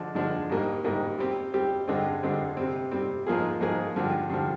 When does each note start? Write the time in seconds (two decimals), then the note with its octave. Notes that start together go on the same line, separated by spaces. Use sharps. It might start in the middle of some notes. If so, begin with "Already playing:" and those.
Already playing: D3 F3 G#3 D4
0.15 D3 F3 G#3 D4
0.50 G#2 G3 A#3
0.84 G#2 G3 A#3
1.19 G3 C4 G4
1.54 G3 C4 G4
1.88 G2 D3 G#3 C4
2.23 G2 D3 G#3 C4
2.57 C3 G3 C4
2.91 C3 G3 C4
3.27 G#2 F3 A#3 F4 G#4
3.61 G#2 F3 A#3 F4 G#4
3.96 G2 D3 F3
4.30 G2 D3 F3